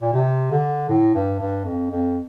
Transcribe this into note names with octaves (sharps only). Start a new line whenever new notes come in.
A#2
C3
D3
A2
G2
G2
F2
F2